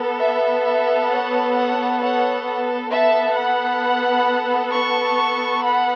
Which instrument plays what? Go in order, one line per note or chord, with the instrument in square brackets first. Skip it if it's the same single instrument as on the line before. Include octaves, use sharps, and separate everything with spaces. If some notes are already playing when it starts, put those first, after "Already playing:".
Already playing: [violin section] B3 A4
E5
E5
C#5 F#5
C#5 F#5
C#5 F#5
B3 A4 E5 A5
F#5 B5
A5 C#6
F#5 B5